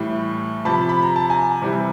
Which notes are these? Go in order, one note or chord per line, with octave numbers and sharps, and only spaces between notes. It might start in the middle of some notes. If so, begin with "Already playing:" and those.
Already playing: A2 E3 G3
C3 F3 A5 B5
B5
A#5
A5
G#5 A#5
C3 E3 G3